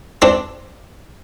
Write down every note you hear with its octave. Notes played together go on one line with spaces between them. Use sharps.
C4 D4